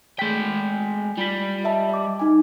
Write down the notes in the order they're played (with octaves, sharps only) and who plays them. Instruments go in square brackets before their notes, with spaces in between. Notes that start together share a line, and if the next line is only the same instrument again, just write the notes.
[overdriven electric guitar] G#3 G5 [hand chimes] A3 G6 B6
[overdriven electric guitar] G3 [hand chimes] F4 B5 B6
[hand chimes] D#5 E5 A5
D#5 D6
D#4 G#5